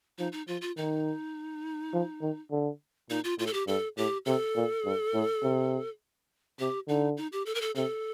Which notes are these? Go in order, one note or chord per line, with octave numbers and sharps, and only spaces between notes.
F3 D#4
D#4
F3 F4
F4
D#3 D#4
F3
D#3
D3
A#2 D#4
F4
A2 F4
A4
G4
G2 A4
A2 G4
C3 A4
A#2
G2
A2
C3
C3 G4
D3 D#4
D#4
G4
A4
A#4
A4
C3 A4